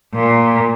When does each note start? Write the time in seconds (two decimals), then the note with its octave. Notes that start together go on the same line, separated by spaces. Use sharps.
0.14 A#2